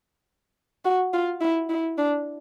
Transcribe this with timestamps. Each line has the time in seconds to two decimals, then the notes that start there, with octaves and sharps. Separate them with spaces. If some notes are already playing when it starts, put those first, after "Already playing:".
0.85 F#4
1.13 F4
1.41 E4
1.69 E4
1.98 D4